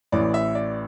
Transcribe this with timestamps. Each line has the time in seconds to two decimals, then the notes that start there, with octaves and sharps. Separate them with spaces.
0.12 A1 A2 E3 D5
0.34 E5
0.55 D5